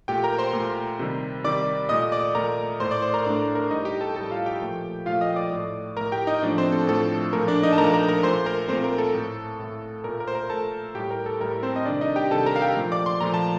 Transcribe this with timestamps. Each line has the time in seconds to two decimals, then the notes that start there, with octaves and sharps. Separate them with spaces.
0.08 A#2 A3 G4 G5
0.24 A#4 A#5
0.38 C5 C6
0.53 A#2 A3
0.99 C3 D#3 G3
1.44 C3 D#3 G3 D5 D6
1.89 A#2 A3 D#5 D#6
2.12 D5 D6
2.35 A#2 A3 A#4 A#5
2.80 A2 A3 C5 C6
2.91 D5 D6
3.02 C5 C6
3.14 A#4 A#5
3.25 A2 A3 D4 D5
3.55 A#4
3.71 A2 G3 D#4 D#5
3.85 G4 G5
4.01 A4 A5
4.16 A2 G3 A4 A5
4.31 F4 F5
4.46 G4 G5
4.61 A#2 F3 A3
5.06 A#2 F3 A3 F4 F5
5.21 D#5 D#6
5.36 D5 D6
5.52 A2 A3
5.97 A2 A3 A#4 A#5
6.12 G4 G5
6.27 D#4 D#5
6.42 A2 F3 A3 D4 D5
6.58 C4 C5
6.72 A4
6.87 A2 F3 A3 A4
7.33 A#2 F3 A3 A#4
7.48 D4 D5
7.63 D#4 D#5
7.73 A5
7.78 A#2 F3 A3 A#4 A#5
7.93 A#4 A#5
8.08 A#4 A#5
8.23 A#2 A3 C5 C6
8.46 A#4 A#5
8.68 A#2 A3 C4 C5
8.84 A#4
8.98 A4
9.14 A2 A3
9.59 A2 A3
10.04 A#2 A3 A#4
10.20 A#4
10.28 C5
10.35 A#4
10.49 A#2 A3 A4 A5
10.95 A2 G3 G4 G5
11.11 A#4
11.26 A4
11.40 A2 G3 A#4
11.63 C4 C5
11.76 D#5
11.85 C3 D#3 G3 D4 D5
12.01 D#4 D#5
12.16 G4 G5
12.31 C3 D#3 G3 A4 A5
12.46 A#4 A#5
12.56 F5
12.61 G4 G5
12.77 A#2 F3 A3
12.92 D5 D6
13.06 C6
13.21 A#2 F3 A3 A#5
13.34 A5